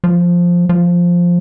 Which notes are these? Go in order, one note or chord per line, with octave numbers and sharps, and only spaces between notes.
F3
F3